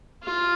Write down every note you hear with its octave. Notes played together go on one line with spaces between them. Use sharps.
F4